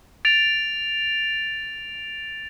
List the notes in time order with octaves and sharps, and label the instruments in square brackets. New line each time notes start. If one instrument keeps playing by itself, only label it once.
[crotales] A6 D7 F7